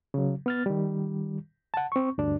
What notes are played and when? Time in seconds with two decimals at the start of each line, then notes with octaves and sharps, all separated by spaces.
0.14 C#3 F#3
0.46 B3 F6 A6
0.66 D#3 G3
1.74 F#5 A5
1.92 C4 C#6
2.18 D2 G2 D4